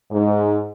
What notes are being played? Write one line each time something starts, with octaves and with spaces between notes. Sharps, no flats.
G#2